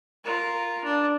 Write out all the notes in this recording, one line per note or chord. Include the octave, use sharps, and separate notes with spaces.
F4 A#4
D4